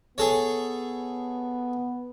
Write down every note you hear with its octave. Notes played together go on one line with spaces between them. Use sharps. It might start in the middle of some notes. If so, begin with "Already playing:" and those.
B3 G#4 A4 C#5